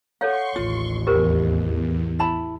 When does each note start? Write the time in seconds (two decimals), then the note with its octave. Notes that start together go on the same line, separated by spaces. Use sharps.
0.21 A4 C#5 F5 F#5 C6 C#6
0.56 A1 D#2 F4
1.07 E2 G4 A#4 C5
2.19 E4 A5 B5